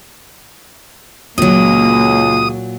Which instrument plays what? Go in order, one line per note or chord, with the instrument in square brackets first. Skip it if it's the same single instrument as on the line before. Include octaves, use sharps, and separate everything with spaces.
[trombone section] C#2 [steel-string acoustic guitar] A#2 F#3 [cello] A#3 [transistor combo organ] D#6